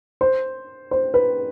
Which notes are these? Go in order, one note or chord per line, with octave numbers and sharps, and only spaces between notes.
C5
C5
B4